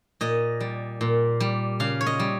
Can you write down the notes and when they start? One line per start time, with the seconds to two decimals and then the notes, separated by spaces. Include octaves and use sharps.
0.21 A#2 D#5
0.60 G3
1.01 A#2
1.40 G3
1.80 C#3 F5
2.01 C#5
2.06 D#5
2.20 G3